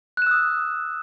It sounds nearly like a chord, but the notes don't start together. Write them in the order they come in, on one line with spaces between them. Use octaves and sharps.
F#6 E7 E6 D#6